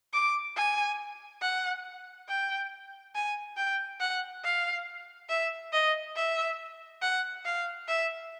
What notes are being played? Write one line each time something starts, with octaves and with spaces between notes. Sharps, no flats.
D6
G#5
F#5
G5
G#5
G5
F#5
F5
E5
D#5
E5
F#5
F5
E5